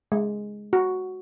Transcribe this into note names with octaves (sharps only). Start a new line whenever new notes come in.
G#3
F#4